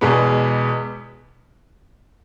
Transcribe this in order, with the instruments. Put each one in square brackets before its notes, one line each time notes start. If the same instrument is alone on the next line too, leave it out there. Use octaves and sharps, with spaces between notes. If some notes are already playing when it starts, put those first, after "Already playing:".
[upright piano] E2 B2 G#3 B3